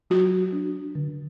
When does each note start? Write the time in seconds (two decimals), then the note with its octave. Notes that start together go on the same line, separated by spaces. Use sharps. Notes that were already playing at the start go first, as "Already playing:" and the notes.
0.10 F#3 F#4
0.53 D4
0.95 D3